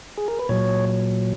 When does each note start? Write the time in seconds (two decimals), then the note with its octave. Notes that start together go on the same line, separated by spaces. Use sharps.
0.17 G#4
0.28 A#4
0.39 B4
0.49 A#2 F#3 C#5